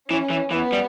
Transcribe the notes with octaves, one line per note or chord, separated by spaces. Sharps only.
E3 C#4
E3
E3 B3
G3